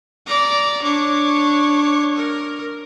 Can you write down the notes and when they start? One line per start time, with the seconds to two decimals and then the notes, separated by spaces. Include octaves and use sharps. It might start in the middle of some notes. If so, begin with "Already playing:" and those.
0.27 D5 A#5
0.83 D4 C#5
2.15 A#4